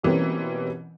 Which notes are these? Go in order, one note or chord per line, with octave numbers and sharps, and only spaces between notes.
B2 E3 G3 A#3 C4 C#4